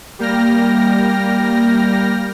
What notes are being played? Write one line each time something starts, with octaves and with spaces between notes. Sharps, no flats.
G3 A#3 G5 F6 A#6